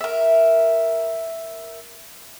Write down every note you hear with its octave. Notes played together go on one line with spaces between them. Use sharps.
A#4 E5